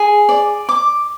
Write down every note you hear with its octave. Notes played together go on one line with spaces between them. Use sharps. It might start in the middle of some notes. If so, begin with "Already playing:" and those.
Already playing: G#4
D5
D6